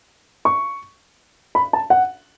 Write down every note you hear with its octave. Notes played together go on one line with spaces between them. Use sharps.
C#6
B5
A5
F#5